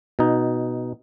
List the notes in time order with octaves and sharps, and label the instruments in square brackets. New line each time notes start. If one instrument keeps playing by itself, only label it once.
[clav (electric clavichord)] B2 D#4